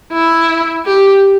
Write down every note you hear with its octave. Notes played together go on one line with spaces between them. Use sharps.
E4
G4